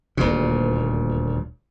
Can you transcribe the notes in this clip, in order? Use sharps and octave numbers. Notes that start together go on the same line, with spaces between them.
D#1 D2 A#2